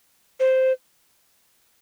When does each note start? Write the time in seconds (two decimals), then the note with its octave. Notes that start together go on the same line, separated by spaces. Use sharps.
0.40 C5